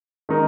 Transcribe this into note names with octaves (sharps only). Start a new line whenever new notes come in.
D#3 G#3 D#4 A#4